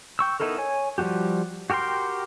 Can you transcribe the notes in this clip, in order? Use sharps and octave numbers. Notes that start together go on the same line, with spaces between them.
G5 C#6 E6
B3 D#4 E4 A4 A#4
C#5 G#5
F3 G3 A3 F#4 G4
F#4 G4 A#4 G5 C6